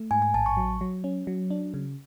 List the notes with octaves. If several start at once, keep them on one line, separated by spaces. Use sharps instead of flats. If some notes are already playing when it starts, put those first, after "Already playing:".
Already playing: A3
G#2 G#5
G#5
A1 A5
C#6
F#3
F#3
C#4
F#3
D4
C#3